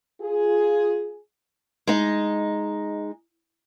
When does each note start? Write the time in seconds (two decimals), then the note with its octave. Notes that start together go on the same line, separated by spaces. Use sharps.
0.21 F4 G#4
1.87 G#3 D#4